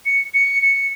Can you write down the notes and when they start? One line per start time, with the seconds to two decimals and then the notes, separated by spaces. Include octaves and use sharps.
0.05 C#7
0.34 C#7
0.62 C#7